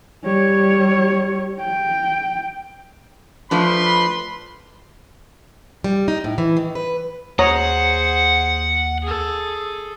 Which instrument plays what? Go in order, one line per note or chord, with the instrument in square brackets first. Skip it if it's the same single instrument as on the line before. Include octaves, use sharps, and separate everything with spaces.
[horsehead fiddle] G3 C#5
G5
[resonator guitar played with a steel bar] F3 A3 D4 [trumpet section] B4 B5 C6
[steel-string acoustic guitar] G3
D#4
A2
E3
D#3
B4
[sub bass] D#2 [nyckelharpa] G#4 C5 [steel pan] C#5 A#5 D#6 [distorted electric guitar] F#5
[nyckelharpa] G#4 A4